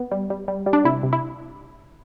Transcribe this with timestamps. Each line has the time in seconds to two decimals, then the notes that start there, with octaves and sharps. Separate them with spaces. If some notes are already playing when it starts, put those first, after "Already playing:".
Already playing: B3
0.11 G3
0.30 G3
0.48 G3
0.66 G3
0.73 D4
0.84 C3 E4
1.03 C3
1.13 E4